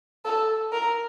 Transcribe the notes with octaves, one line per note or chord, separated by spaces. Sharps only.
A4
A#4